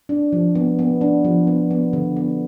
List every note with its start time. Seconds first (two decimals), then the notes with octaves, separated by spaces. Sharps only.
0.09 D4
0.33 F3
0.55 B3
0.79 B3
1.01 D4
1.24 F3
1.47 B3
1.71 B3
1.93 D3
2.16 B3